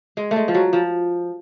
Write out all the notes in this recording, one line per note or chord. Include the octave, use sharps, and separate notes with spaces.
G#3
A3
G#3
F3
F#3
F3